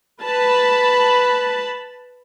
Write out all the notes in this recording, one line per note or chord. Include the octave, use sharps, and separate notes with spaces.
B4 A5 B5